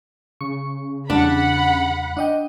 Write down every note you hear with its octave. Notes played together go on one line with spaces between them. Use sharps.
C#3 C#6
E2 G3 D4 F#5 B5
D4 D#5 G5